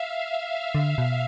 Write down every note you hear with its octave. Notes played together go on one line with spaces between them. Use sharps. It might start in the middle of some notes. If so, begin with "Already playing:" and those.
Already playing: E5 F5
D3
B2